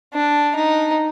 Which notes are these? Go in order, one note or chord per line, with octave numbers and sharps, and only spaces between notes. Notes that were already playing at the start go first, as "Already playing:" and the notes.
D4
D#4